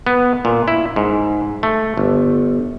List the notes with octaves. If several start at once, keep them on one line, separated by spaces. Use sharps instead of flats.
B3
A#2
E4
G#2
A3
G1